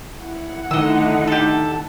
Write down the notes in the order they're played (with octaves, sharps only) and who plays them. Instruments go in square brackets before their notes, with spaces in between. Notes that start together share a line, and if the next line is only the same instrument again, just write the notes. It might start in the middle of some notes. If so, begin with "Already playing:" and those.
[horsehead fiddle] E4 F#5
[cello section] D3 A3 D#4 [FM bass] D#3 [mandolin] D#5 E6
[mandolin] G4 A4